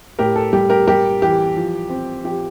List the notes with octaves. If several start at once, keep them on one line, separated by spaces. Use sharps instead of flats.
A2 G4 A#4
A4
G3 G4
G4 A#4
G3 G4 A#4
E3 G4
F3
C4
F3 G4